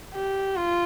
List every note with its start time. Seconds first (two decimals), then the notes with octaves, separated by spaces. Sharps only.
0.14 G4
0.56 F4